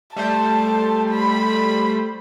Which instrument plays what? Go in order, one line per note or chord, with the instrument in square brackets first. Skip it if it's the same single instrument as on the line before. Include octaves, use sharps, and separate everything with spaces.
[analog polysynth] G3 A3 C5 [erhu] A5
[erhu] B5